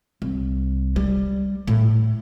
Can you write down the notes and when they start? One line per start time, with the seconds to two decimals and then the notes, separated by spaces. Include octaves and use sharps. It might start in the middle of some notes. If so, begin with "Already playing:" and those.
0.22 C2
0.96 G3
1.68 A2